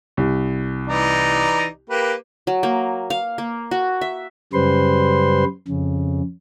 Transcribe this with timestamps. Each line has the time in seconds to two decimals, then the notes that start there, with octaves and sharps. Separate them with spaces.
0.17 C2
0.87 E3 D#4 D5
1.89 A#3 G4 B4
2.47 F#3
2.63 A#3
3.10 F5
3.38 A#3
3.71 F#4
4.01 E5
4.53 F#2 C#3 G3 B4 C5 C6
5.68 F2 C#3